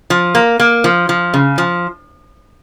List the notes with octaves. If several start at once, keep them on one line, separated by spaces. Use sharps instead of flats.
F3
A#3
A#3
F3
F3
C#3
F3